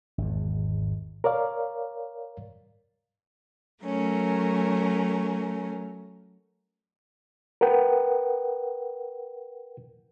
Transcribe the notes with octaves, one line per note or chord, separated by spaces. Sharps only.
G#1 E2
A#4 C#5 D5 F5
F#3 A3 C#4 A#4
A#4 B4 F#5 G5